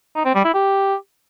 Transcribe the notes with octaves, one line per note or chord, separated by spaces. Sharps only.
D#4
C4
G3
E4
G4